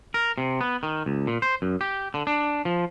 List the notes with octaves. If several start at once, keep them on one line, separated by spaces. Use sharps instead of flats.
A#4
C3
B3
D#3
C#2
A#2
C5
F#2
G4
D3
D4
F3